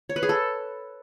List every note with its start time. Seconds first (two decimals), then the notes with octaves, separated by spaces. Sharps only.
0.09 C#5
0.16 B4
0.23 G#4
0.29 A4